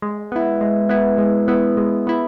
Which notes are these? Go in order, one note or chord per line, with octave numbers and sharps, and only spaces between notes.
G#3
B3 E4
G#3
B3 E4
G#3
B3 E4
G#3
B3 E4